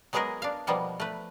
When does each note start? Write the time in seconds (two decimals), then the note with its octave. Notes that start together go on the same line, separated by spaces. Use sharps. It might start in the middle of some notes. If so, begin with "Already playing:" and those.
0.13 F#3 G#3 B3 G#4 A#4 D#5
0.42 D4 F5
0.67 B2 F3 G3 A#3 B3
1.00 A3 B4